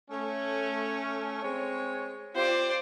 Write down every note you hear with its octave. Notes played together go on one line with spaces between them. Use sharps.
A3 C#4
G#3 C4 C#5
C4 F4 G4 C5 D5